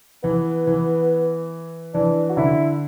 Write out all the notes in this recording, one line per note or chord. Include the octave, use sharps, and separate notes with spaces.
E3 B3
E3
E3 D4
F#4
D3 E4